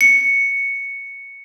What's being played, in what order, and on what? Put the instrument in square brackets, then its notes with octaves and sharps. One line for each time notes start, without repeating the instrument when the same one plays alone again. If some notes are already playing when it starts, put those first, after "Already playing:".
[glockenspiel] C#7